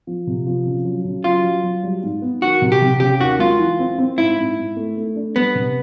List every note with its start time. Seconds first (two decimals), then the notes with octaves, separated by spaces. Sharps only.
0.07 F3
0.27 C3
0.47 F3
0.66 C#3
0.85 F#3
1.04 C#3
1.24 F#3 F4
1.44 F#3
1.63 F#3
1.83 G3
2.03 G#2
2.22 B3
2.41 D#3 F#4
2.62 C3
2.72 G4
2.82 C3
3.00 C#3 G4
3.20 D#2 F#4
3.39 G#3 F4
3.59 E3
3.79 C4
3.98 C4
4.18 G#2 E4
4.37 G#2
4.57 G#2
4.76 A3
4.97 A3
5.16 D4
5.35 G3 B3
5.55 C3